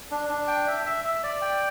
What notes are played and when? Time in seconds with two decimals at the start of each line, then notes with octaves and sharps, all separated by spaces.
0.11 D4
0.29 D4
0.48 G5
0.67 E5
0.86 E5
1.04 E5
1.23 D5
1.42 G5